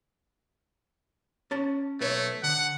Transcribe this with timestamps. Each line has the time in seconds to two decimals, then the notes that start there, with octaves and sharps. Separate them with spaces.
1.51 C#4 A5
2.01 B1 A3 B4 C#5
2.43 D3 F#5